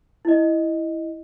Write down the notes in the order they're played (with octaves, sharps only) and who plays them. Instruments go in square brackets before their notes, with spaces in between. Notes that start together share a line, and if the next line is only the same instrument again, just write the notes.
[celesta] E4 D#5